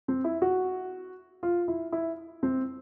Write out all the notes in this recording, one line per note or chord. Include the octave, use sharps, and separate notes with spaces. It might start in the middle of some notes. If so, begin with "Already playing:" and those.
C4
E4
F#4
F4
E4
E4
C4